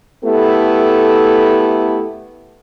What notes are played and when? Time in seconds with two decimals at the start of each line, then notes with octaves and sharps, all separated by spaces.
0.24 A3 B3 E4 G4 A4